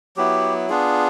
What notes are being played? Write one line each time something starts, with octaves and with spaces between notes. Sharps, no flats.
F#3 B3 E4 G4
B3 D4 F4 G#4